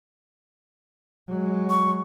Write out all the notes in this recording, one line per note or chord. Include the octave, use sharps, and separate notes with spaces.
F#3 G#3
C#6